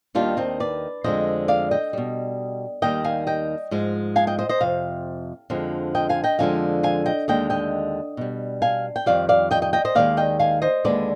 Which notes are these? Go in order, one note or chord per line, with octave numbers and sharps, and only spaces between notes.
D#2 D#3 G3 D4 F4
C4 D#4
B4 D5
F2 D3 G#3 C5 D#5
D5 F5
D#5 G5
B2 G3
D#2 D#3 G3 D#5 G5
F5 G#5
D#5 G5
G#2 F3 G#3
F5 G#5
D#5 G5
C5 D#5
C5 D#5
F2 C3 F5
F2 D3 F3 G#3
D#5 G5
F5 G#5
D#5 G5
F2 D3 F3 G#3 F5 G#5
F5 G#5
D#5 G5
D#2 D3 G#3 D#5 G5
D#5 G5
B2 G3
F5 G#5
G5
F2 D#3 G3 D5 F5
D5 F5
D#5 G5
D#5 G5
D#5 G5
C5 D#5
D#2 D#3 G#3 D5 F5
D#5 G5
F5 G#5
C5 D#5
D#2 D3 G#3 B4 D5